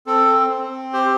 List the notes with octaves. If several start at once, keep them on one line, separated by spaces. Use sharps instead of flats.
C4 A4
C4
G4 C5